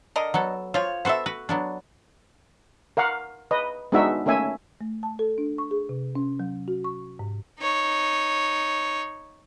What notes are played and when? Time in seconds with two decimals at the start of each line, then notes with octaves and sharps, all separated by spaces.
0.16 D3 A#4 D#5
0.34 F#3 B3 A4
0.74 F3 F4 C#5
1.05 B3 F#4 A4 C5 E5
1.26 F#4 B4
1.49 F#3 B3 D4
2.97 A#4 F5 F#5
3.51 B4 D#5
3.92 G#3 B3 D4 D#4 F#4 E5
4.26 A3 A#3 C#4 E5 G#5
4.81 A3
5.03 A5
5.19 A4
5.38 D4
5.58 C#6
5.71 G#4
5.89 C3
6.15 C#4
6.40 F#3
6.68 F#4
6.84 C#6
7.19 G#2
7.60 D#4 C#5